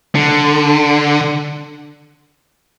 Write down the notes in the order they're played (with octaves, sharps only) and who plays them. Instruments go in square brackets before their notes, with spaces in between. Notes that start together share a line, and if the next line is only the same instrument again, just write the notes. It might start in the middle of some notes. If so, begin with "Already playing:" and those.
[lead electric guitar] D3